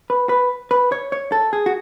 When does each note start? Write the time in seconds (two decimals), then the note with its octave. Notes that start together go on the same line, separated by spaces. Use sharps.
0.10 B4
0.29 B4
0.71 B4
0.92 C#5
1.12 C#5
1.32 A4
1.53 G#4
1.66 F#4